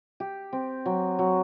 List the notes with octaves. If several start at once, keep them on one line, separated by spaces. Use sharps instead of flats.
G4
C4
F#3
F#3